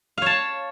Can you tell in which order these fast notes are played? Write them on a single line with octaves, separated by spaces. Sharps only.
F5 C#5 A5